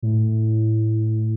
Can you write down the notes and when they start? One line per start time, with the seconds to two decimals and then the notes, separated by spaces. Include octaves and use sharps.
0.02 A2